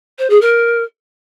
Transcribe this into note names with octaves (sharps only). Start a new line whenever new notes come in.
C5
G#4
A#4